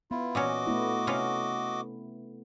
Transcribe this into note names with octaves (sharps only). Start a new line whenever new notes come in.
B3 E4 F4
A#2 E3 C#4 F#4 D#5 D6
A3 B3 E4
C3 C#4 F4